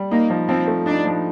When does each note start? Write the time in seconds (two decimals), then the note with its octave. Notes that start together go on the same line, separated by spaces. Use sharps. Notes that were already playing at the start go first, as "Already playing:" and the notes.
Already playing: G3
0.11 A#3 D#4
0.30 F3
0.49 F3 C4
0.67 A3
0.86 D4 D#4
1.05 F3